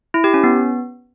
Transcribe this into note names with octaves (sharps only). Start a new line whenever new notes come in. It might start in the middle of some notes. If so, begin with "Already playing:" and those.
E4
G4
C#4
B3